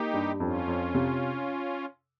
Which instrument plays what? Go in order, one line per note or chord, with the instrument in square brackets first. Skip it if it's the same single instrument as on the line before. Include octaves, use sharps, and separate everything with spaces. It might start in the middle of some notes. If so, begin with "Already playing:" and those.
Already playing: [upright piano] A#3 [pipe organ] D#4 G4
[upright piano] G2
[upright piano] F2 [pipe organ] C#4 F4
[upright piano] F2
C3